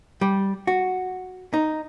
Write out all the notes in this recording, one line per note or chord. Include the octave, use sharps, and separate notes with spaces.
G3
F#4
D#4